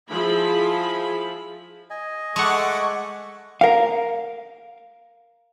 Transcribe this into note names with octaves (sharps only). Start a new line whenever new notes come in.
F3 E4 F4 G#4 B5
D#5 G#5
G#3 A3 A4 F#5 C#6 D6
A#4 F5